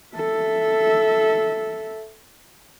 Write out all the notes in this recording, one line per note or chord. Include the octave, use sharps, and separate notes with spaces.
A4 E5